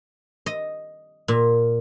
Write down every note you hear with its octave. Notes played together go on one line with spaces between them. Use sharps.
D#5
A#2